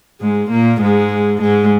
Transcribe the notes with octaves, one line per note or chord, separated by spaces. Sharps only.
G#2 G#3
A#2 A#3
G#2 G#3
G#2 G#3